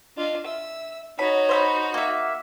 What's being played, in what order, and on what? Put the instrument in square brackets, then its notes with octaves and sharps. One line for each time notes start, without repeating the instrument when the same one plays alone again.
[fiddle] D4 F4 [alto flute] D#5
[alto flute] E5 [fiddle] E6
[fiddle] D#4 F#4 [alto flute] C#5 [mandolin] B5
[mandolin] C5 E5 B5
[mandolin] A#3 E5 [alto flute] F#5